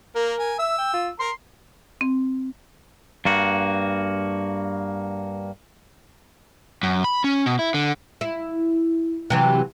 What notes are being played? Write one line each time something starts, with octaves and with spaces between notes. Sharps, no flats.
A#3 A#4
G#5
E5 E6
G5
F4
A#4 C6
C4
G2 A#3 F#4
F#2
B5
C#4
B2
E4
D3
E4
C3 E3 F#3